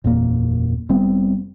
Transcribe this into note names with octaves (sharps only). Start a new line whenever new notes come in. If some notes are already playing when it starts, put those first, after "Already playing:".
F#1 E2 A#2 A#3
F1 G3 B3 C4